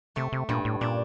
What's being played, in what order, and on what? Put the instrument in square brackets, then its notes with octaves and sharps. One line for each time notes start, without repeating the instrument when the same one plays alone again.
[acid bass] C3 [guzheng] A3
[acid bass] C3
[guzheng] G2 [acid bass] A#2
[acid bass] A2
[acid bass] A#2 [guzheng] D4